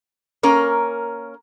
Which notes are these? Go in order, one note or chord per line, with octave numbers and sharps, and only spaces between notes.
A#3 C#4 A#4